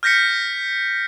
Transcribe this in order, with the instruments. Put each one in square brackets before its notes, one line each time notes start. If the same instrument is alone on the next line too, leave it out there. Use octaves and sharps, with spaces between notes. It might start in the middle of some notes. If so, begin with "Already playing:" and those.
[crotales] F6 G6 A#6 B6 C#7